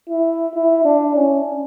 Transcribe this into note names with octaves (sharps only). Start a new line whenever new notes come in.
E4
E4
D4
C#4